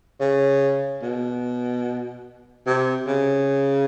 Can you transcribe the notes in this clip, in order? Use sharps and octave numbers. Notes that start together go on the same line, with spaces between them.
C#3
B2
C3
C#3